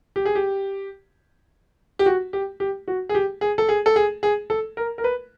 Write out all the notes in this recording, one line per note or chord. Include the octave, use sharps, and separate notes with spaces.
G4
G#4
G4
G4
F#4
G4
G4
F#4
G#4
G4
G#4
A4
G#4
A4
G#4
G#4
A4
A#4
A#4
B4